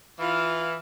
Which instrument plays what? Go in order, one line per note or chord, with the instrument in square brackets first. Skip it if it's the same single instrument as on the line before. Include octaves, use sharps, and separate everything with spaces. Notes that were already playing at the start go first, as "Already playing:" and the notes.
[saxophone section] E3 [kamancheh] F4 F5